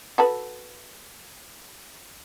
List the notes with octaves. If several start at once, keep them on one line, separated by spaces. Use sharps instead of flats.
F#4 A4 B4